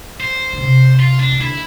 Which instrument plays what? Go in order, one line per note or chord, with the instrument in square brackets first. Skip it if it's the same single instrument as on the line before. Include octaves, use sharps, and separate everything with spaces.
[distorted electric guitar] C5
[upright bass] D3
C3
[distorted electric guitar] F4
D4
[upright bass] E3
[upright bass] D3 [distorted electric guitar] E4